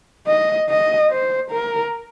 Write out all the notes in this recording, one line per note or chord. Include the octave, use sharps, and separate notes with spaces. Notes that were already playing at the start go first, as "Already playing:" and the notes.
D#5
D#5
C5
A#4